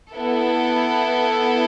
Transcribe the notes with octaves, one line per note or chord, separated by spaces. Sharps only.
B3 E4 A4